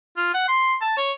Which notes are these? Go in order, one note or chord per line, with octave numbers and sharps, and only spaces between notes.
F4
F#5
C6
A5
C#5